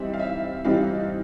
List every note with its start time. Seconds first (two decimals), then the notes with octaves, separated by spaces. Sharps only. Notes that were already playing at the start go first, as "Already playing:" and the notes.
Already playing: E3 G3 C4 D#4 E5
0.14 F5
0.20 E5
0.65 E3 G3 C4 D#4 F5